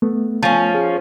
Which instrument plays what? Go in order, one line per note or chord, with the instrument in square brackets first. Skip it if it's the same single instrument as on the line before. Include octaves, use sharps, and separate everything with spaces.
[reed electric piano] A3 B3
[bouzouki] F3 C#4
[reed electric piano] G#4